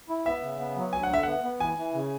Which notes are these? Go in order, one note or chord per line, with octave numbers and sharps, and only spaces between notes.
E4
B3 E5
C#3
B3
F#3
D2 G#5
F#5
D3 E5
B3 F#5
B3
E3 G#5
E3
C#3